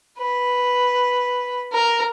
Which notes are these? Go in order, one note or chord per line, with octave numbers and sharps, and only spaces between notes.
B4
A#4